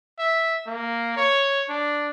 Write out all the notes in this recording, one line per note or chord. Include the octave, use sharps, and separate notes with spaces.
E5
A#3
C#5
D4